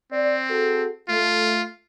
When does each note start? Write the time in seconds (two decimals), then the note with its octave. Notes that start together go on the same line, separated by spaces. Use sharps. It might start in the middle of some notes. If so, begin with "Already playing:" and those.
0.12 C4 D5
0.50 F#4 G#4 A4
1.09 A3 F4